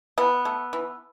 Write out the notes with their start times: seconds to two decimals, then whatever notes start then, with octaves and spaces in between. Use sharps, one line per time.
0.18 E3 B3
0.45 A3
0.73 E3